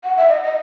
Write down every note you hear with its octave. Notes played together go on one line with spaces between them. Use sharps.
F#5
E5
D#5
D#5